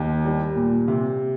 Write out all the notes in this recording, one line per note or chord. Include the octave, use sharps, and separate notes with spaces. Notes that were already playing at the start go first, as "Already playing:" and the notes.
Already playing: D#2
G3
A#2
C3